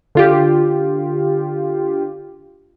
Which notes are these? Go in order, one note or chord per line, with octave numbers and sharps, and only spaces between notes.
D3 F4 G4